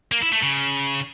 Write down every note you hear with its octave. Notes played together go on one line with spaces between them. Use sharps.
A#3
E4
A3
C#3